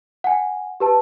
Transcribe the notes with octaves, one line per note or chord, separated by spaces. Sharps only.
F#5 G#5
G4 B4 A5